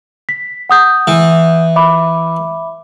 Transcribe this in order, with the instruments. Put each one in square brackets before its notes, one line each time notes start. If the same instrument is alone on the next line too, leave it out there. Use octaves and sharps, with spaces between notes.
[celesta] B6
F#5 D#6 G6
[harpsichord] E3
[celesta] E5 B5 D6